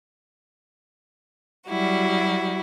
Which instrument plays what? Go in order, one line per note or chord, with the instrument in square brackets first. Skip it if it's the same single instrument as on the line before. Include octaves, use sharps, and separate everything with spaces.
[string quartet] F#3 G3 E4 F#4